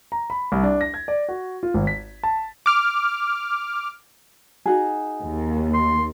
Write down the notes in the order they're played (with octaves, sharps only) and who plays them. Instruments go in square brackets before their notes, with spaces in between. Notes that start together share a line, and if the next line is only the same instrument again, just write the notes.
[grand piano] A#5
B5
C2
D4
A#6
G#6
D5
F#4
F4
G#1
B6
A5
[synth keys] D6 F6
[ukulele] D#4 F#4 G#4
[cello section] D#2
[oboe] C6